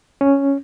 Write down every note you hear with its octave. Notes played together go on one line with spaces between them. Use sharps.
C#4